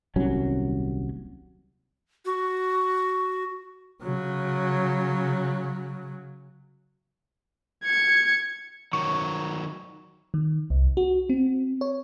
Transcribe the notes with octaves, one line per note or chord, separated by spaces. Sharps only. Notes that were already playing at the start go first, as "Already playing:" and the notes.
D#1 C2 F#3 C#4
F#4
C#3 F#3
G#6 C#7
D#3 F#3 C#6
D#3
C2
F#4
C4
C#5